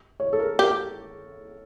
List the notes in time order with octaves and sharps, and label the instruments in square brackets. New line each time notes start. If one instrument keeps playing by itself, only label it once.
[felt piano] C#5
A4
A#4
[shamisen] G4 [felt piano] A#4